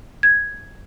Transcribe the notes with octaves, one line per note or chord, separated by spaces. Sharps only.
G#6